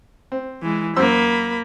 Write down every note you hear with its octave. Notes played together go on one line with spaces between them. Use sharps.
C4
E3 G#3
F#2 A#3 C5 B5 E6